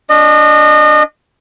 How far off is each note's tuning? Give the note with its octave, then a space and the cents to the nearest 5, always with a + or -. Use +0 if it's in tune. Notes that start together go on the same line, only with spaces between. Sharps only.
D4 -20 D#5 -30